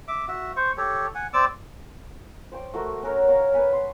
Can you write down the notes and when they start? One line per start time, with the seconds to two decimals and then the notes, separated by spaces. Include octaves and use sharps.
0.08 E5 D6
0.28 F#4 E5
0.56 C5 C#6
0.77 G4 A4 C#5
1.15 F#5 G#5
1.33 C4 D5 D6 E6
2.52 C5 G5 C#6 D6
2.74 A3 F#4 A#4
3.03 C#4 F#4 A#4 C#5
3.28 C#5 F5 A#5
3.54 B4 F#5 G#5 B5
3.72 C6